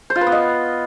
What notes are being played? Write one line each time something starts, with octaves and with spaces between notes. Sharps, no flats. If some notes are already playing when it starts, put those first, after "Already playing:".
C5
F4
B4
B3
D#5